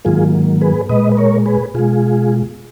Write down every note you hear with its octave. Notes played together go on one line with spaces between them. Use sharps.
G#2 D#3 F#3 A#3 F4 G#4
G#4 B4
A#2 G#3 B4 D#5
B4
A#4 C#5
G#4 B4
B2 G#3 F4 G#4